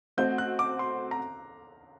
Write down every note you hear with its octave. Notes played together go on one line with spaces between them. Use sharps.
A3 C4 F#4 C5 D#5 G6
F#6
D6
C6
A#5